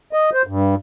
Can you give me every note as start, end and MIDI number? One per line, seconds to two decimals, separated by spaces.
0.13 0.30 75
0.33 0.42 72
0.47 0.75 43